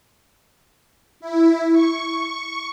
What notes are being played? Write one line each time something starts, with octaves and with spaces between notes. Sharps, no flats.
E4
C#6